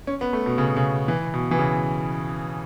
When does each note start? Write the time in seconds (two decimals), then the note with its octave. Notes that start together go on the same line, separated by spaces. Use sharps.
0.07 C#4
0.21 B3
0.33 A3
0.46 B2
0.58 C#3
0.66 B2
0.77 C#3
1.08 E3
1.34 B2
1.51 E3
1.59 C#3